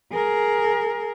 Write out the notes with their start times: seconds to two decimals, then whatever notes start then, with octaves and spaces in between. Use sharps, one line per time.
0.13 G#4 A#4